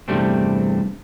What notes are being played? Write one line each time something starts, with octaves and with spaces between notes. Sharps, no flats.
E2 G2 C3 G3 A3 C4